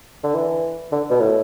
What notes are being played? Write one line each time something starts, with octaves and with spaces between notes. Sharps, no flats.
D3
E3
D3
B2
A2